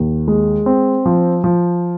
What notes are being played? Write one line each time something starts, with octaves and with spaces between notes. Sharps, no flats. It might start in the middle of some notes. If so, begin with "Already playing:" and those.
Already playing: D#2
G#3
C4
F3
F3